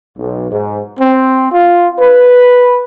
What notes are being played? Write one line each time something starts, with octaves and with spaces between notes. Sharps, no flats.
B1
G#2
C4
F4
B4